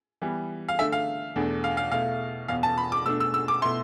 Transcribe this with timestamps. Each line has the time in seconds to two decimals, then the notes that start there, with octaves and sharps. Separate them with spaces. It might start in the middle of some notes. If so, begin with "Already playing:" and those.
0.22 E3 G3 B3
0.68 F5
0.79 D3 A3 D4 E5
0.92 F5
1.36 E2 B2 A3 D4
1.64 F5
1.77 F5
1.91 B2 A3 E4 F5
2.48 E2 B2 B3 F5
2.63 A5
2.78 B5
2.92 D6
3.06 B2 A3 D4 E6
3.20 E6
3.34 E6
3.48 D6
3.62 B2 A3 E4 C6